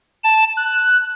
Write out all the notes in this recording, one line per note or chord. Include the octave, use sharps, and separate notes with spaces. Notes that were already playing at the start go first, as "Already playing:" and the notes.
A5
F#6